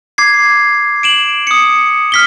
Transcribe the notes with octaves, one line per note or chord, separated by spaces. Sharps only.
D6 G#6 C7
D7 E7 F#7
D#6 C#7
F6 B6 G7